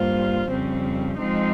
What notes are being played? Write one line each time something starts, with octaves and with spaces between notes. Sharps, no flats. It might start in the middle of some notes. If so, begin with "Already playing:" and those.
Already playing: G2 G3 A#3 F4 C5
F2 C#3 G3 C4
F3 G#3 C4 D#4